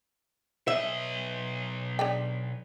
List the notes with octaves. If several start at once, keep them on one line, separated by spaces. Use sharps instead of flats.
B1 D#5 E5
D4 G#4 G5